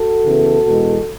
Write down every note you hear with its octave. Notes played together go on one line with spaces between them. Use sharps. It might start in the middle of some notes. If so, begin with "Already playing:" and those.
Already playing: F#4 A4
C#3 E3 B3
E2 B2 G#3 B3